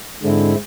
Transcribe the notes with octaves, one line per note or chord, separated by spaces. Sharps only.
G#2 D3 G#3 C4 E4